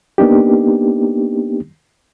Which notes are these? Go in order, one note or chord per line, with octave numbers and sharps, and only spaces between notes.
A#3 B3 D4 D#4 G4